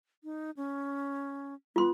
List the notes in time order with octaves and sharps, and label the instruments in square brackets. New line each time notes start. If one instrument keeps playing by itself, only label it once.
[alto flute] D#4
C#4
[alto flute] B3 [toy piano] F4 C6